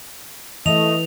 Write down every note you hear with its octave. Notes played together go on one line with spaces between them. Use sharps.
E3 A3 D#5 F7